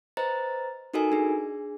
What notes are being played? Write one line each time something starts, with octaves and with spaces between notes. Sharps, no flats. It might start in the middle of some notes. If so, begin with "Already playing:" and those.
B4 C5 D#5 A#5 A6
D#4 F#4 A4 A#4 D#5 G#5
D4 G#4